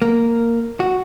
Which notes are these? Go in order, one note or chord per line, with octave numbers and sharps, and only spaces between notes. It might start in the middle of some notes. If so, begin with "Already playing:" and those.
A#3
F#4